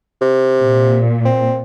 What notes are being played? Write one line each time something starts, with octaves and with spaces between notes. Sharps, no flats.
C3
A#2
C4